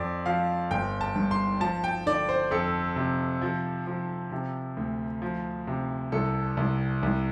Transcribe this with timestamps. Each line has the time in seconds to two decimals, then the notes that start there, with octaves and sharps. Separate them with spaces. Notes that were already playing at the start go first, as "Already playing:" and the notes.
Already playing: F2 D5
0.26 F3 F5
0.71 G1 G5
1.01 A5
1.16 G2
1.31 C6
1.60 F3 A5
1.84 G5
2.06 D3 D5
2.29 C5
2.51 F2 A4
2.96 C3
3.42 F3
3.87 F3
4.32 C3
4.77 D2
5.22 F3
5.67 C3
6.12 C2 A4
6.57 C2
7.03 C2